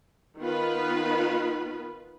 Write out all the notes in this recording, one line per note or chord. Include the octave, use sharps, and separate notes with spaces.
D#3 B3 F4 B4